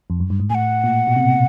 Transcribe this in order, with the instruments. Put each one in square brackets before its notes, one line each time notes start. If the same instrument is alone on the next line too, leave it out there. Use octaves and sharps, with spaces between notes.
[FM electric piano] F2
F#2
G2
G#2
[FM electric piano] A2 [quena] F#5 G#5
[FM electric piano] A#2
B2
C3